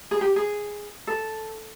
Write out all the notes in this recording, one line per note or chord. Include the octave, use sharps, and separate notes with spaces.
G#4
G4
G#4
A4